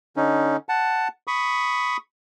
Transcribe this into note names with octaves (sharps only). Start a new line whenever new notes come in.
D3 C#4 D#4
F#5 A5
B5 C#6 D#6